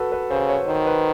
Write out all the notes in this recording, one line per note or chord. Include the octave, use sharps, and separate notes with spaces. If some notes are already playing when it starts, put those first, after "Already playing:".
Already playing: F#4 A4 B4
B4
C#3 C5
C#5
D#3 C5
B4